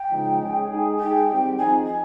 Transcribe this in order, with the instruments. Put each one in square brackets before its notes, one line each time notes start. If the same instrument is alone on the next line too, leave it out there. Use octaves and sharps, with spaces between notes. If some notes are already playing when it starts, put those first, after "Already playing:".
Already playing: [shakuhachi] G5
[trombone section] C#3 F3 G#3 D#4
G#3 C#4 G#4
G#3 D#4 G#4
[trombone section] G#3 D#4 G#4 [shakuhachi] G5
[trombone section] D#3 G3 C4 G4
[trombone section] F3 C4 D#4 G#4 [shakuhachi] G#5
[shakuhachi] G#5